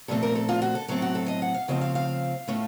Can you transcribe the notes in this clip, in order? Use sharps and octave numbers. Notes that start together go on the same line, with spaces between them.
A#2 F3 A3 C4 A4
A#4
A4
F4
F#4
A4
A2 F#3 C4 A4
F#4
A4
D#5
F#5
F5
C#3 F3 A3 C4 F4 D#5
F5
F5
A2 A3 C#4 F4